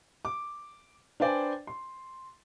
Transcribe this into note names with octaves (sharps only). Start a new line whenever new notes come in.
D6
D4 B4 C5 D5 G5 G#5
C6